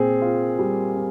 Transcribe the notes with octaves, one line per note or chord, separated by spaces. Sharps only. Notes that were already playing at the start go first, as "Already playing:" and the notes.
Already playing: A#2 C4 G#4
F4
G3
C4